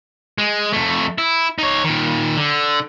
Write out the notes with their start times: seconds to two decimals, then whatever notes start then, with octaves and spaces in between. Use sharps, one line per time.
0.38 G#3
0.73 F2 A3
1.18 E4
1.58 D#4 C#5
1.84 A#2 D#3
2.36 D3